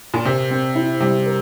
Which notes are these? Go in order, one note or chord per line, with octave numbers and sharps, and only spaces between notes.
A#2
C3 A#4
C4
E4
C3 G3
A#4